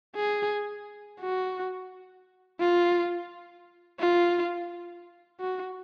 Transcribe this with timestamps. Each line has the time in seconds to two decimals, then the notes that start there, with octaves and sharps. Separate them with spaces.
0.16 G#4
1.20 F#4
2.60 F4
4.00 F4
5.40 F#4